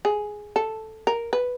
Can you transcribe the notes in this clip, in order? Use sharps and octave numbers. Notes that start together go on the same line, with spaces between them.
G#4
A4
A#4
B4